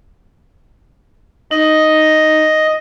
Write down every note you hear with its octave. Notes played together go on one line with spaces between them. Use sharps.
D#4 D#5